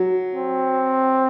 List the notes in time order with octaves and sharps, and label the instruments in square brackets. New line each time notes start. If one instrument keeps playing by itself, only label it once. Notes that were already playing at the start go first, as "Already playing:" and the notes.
Already playing: [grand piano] F#3
[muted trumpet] C4